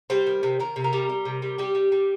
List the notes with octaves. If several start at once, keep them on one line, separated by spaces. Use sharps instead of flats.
G3 C5
D#3
C3
D#3 A#4
C3
A#4
G3
G3
C3
G3
G3 G4
G3
G3